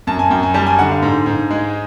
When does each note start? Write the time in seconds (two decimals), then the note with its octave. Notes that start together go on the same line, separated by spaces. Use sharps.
0.07 F#2 A5
0.19 G#5
0.31 F#2 G5
0.43 G#5
0.54 G3 A5
0.67 G#5
0.78 D3 F#5
0.91 F5
1.02 G#2
1.26 G#2
1.51 G#3